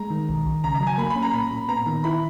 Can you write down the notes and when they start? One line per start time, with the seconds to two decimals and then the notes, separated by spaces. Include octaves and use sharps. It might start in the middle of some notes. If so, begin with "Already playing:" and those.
Already playing: G#3 A#5
0.10 D#3
0.29 B1
0.45 B1
0.64 C#3 A#5
0.75 A#5
0.80 F#3
0.87 G#5
0.98 A#3 B5
1.10 B5
1.16 C#4
1.22 A#5
1.33 A#2 B5
1.51 A#2
1.69 B3 A#5
1.86 D#3
2.04 E4 B5